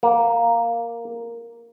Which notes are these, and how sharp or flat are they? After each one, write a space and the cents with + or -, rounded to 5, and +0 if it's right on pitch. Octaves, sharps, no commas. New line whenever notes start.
A#3 +0